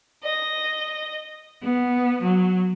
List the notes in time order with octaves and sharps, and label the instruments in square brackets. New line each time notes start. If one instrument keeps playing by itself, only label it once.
[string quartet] D#5
B3
F#3